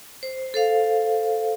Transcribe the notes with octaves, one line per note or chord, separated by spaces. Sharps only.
C5
A4 C5 F5